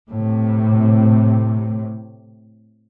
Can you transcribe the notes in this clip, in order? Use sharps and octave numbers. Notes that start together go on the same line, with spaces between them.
A2 C3